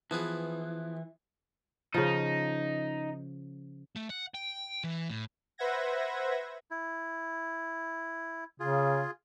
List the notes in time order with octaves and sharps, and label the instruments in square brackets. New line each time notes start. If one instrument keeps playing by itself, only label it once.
[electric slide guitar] E3 [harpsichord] F3 B3 G#4
[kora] C#3 F3 [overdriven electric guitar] D#4
[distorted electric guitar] A3
F#5
G5
E3
A2
[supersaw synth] B4 C5 E5 F#5 G#6 A#6
[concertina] E4
[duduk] C#3 [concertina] F4 G#4